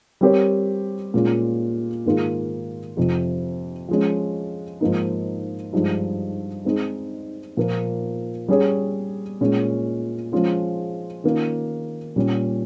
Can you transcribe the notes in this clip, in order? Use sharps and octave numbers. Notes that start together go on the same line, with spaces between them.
G3 C4 G4 A#4 C#5
A#2 G#3 C#4 F4
G#2 D#3 A#3 F4 G#4
F2 C3 F3
F3 G#3 C#4
G#2 F3 A#3 D#4
G2 F3 G#3 D#4
G#3 C4 D#4 G#4
A#2 F3 A#3
G3 C#4 G#4 C#5
A#2 G#3 C#4
F3 G#3 C#4 F4 G#4
D#3 A#3 C#4 F4
A#2 G3 C#4